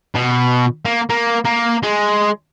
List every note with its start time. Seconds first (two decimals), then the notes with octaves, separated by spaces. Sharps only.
0.15 B2
0.85 A#3
1.09 A#3
1.45 A#3
1.83 G#3